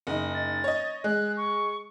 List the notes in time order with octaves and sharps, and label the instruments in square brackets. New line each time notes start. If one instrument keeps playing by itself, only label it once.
[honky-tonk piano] F#1 D#4
[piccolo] A6
[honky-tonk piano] C#5 D#5
[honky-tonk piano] G#3 [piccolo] F#6
[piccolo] C#6